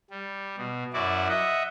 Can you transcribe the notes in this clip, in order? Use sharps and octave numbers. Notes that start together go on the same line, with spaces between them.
G3
B2
F#2 E4 F#4 D5
D#5 E5 F#5